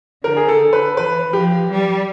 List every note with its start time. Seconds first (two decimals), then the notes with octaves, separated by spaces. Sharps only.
0.24 D3 A#4
0.36 G#4
0.48 A4
0.73 B4
0.97 E3 B4
1.33 F3 G4
1.70 G3